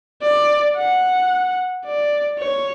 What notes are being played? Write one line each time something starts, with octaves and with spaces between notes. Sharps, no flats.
D5
F#5
D5
C#5